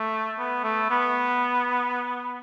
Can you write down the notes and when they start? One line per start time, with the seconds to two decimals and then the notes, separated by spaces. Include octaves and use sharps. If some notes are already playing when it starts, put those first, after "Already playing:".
Already playing: A3
0.39 B3
0.64 A3
0.90 B3